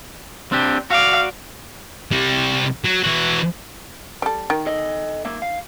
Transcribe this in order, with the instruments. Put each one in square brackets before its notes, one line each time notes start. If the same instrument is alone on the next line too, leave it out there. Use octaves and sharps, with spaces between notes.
[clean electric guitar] C4 D4 G4
[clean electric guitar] F#4 D5 [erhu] F5
[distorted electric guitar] C3 G3
F#3
E3 F#4
[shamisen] G3 A4
D#3
[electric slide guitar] A4 D#5
A#3 E5
F5